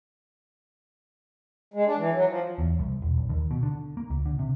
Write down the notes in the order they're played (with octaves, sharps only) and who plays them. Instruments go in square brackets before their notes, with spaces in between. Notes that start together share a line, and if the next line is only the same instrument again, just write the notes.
[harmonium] G#3
D4
E3
F#3
F3
[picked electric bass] E2
C2
E1
B1
D#2
B2
D3
A#3
C#2
D3
C3